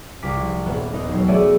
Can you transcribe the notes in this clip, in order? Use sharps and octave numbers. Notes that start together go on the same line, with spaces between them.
C2 F4 D6 B6
F3
D#1 B3
D#2 D#4
E1 F#3
A3 B3 G#4 C#5 D5 E5